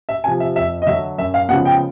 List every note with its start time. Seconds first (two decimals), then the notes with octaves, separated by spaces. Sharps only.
0.09 E5
0.24 C3 G#5
0.28 F3
0.40 E5
0.56 F2 E5
0.82 D#5
0.86 D3 F#3 E5
1.18 F#2 E5
1.34 F5
1.49 C#3 F3 G#3 B3 F#5
1.65 G5